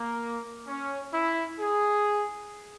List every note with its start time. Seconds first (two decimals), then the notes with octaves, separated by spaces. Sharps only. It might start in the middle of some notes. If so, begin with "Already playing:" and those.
Already playing: A#3
0.67 C#4
1.13 E4
1.59 G#4